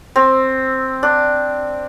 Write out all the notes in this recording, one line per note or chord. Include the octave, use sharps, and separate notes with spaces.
C4
D4